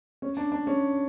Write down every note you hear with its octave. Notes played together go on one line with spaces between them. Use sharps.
C#4
D4
D4
C#4